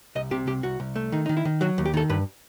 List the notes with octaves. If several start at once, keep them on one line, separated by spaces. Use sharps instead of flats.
C2 D#5
C3 G4
C2 G4
C2 F#4
C2
A3
D#3 D#4
D#3 D#4
E4
D#3
F#3 F#4
D#2
G4
D#3 A4
G2 B4